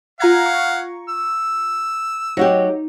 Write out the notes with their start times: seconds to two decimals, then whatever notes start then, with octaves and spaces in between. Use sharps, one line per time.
0.20 F4 F5 F#5 A#5 G#6
0.46 C#6
1.09 E6
2.37 F#3 D#4 F#4 G4